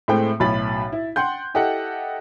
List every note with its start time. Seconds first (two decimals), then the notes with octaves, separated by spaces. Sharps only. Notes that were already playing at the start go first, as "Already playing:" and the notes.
0.08 A2 G#3 A3 C4 G5
0.40 B1 A2 C#5 B5 A6
0.92 E4
1.16 F#5 G5 C6 G6
1.54 E4 G4 A4 D#5 F#5